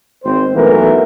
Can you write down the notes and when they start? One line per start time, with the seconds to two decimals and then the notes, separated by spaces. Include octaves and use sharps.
0.24 G#1 C4 C5
0.54 B1 E3 A3 B3 A#4